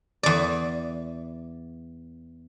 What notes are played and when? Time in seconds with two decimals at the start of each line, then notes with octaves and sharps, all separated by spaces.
0.23 E2 D5